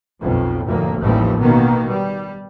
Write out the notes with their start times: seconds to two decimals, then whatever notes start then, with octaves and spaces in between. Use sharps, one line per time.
0.22 B1 F2 B2
0.66 F1 D2 A2 A#3
0.99 A1 D#2 E3 F3 G3
1.40 B2 D#3 A#3 B3
1.87 G3